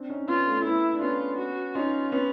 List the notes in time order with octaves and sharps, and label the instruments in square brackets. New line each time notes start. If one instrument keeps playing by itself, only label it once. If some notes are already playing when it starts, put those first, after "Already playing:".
Already playing: [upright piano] C4 D4
C#4 D#4
[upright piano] B3 C#4 [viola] F4
[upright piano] A3 B3
[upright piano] A3 B3 [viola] E4
[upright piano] D4
[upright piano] B3 C#4 [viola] F4
[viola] F#4
[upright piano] C#4 D#4 [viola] F4
[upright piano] B3 C#4